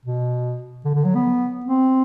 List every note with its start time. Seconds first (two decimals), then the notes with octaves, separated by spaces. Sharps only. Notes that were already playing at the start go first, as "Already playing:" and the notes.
0.05 B2
0.85 D3
0.95 D3
1.05 F#3
1.15 B3
1.65 C4